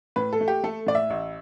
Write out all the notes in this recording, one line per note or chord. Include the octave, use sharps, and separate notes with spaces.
A2 B4
A4
A3
G4
A3 A4
A2 D5
E5
A1